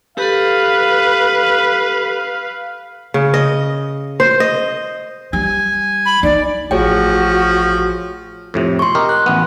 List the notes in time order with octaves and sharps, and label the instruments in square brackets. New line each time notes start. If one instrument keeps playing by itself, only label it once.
[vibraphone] G4 A4 [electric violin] B4 [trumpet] F5
[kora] C#3
D#5
C5
D#5
[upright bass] G3 [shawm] G#5
[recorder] B5
[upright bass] D#4 [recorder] D5
[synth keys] A1 [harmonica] F3 [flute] F#4 [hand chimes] G#4 C#5 G5
[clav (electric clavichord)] F2 A2 C3
[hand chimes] C6 C#6
[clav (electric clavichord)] G4 A#4 D#5
[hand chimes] F#6
[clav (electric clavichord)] A1 B3